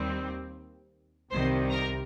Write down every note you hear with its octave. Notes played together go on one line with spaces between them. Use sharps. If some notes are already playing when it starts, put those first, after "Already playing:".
Already playing: D#2 D#3 G3 C4
C2 C3 D#3 G3 C5 C6
A#4 A#5